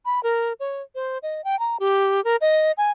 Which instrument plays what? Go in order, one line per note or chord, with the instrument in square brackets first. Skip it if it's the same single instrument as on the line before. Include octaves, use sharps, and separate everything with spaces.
[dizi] B5
A#4
C#5
C5
D#5
G5
A#5
G4
A#4
D#5
G#5